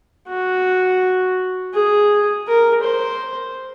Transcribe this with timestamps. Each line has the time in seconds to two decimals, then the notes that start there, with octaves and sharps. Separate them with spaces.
0.28 F#4
1.74 G#4
2.47 A#4
2.83 C5